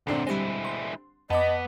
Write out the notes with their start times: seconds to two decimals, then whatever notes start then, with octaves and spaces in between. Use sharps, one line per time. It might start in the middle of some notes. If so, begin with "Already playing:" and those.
0.07 D2 A#2 D3 C4 D4 C7
0.27 G3 G#3 E4 G4 C5
0.65 C6
1.30 F2 B3 D#5 A5 B5 D6